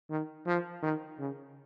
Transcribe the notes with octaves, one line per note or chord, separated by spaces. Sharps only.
D#3
F3
D#3
C#3